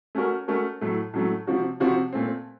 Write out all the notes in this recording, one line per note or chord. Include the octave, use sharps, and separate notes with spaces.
A3 C#4 F#4 A#4
A3 C#4 F#4 A#4
A2 F#3 A3
A2 F#3 A3
C3 F3 C4 F#4
C3 F3 C4 F#4
A#2 A3 C4